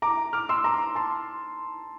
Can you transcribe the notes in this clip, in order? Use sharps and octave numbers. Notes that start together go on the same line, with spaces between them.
A#5 D6
D6 F6
C6 E6
A#5 D6
A5 C6